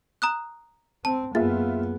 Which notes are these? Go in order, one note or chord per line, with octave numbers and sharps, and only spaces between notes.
A#5 D#6 F#6
C4 A5
F#2 A#3 B3 F4 G#4 E5 A6